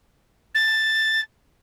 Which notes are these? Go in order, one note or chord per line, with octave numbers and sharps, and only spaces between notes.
A6